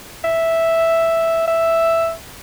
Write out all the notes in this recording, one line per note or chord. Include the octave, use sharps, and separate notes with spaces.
E5
E5